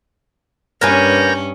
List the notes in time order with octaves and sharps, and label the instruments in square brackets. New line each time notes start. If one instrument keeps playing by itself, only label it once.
[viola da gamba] G2 C#4 [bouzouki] A#3 B4 G#5 [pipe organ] C#5 G6 A#6